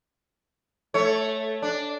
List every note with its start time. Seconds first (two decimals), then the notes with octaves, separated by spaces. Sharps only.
0.94 A3 C#5
1.62 D4